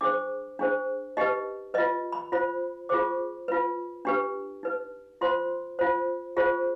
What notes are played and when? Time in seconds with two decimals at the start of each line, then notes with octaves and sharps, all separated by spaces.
0.01 D4 G#4 C5 D6
0.59 D4 G#4 C5
1.17 D#4 G4 B4 D#5
1.74 B4 D#5
1.78 F4
2.12 B5
2.32 F4 C5 B5
2.89 F4 G#4 C5 D6
3.48 F4 B4
4.05 D4 G4 B4
4.63 D#4 B4
5.21 F4 C5 C6
5.79 F4 C5
6.37 F4 G#4 C5